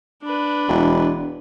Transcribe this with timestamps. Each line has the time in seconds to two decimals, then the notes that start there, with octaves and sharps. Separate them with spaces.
0.22 D4 B4
0.69 E1